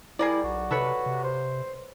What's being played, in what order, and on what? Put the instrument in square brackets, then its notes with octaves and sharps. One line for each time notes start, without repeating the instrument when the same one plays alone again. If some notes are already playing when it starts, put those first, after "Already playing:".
[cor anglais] G3 [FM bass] E4 [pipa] G#4 A#4 D5
[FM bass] B1 [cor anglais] F#4
[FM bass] C3 [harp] A4 B4 C#5
[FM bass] C3
[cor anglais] C5